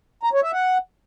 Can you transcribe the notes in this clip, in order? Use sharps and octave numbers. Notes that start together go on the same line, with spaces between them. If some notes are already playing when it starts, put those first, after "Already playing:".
A#5
C#5
E5
F#5